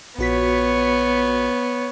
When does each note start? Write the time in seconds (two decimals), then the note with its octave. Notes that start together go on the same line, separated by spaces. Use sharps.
0.19 A#1 B3 F#4 C#5 B6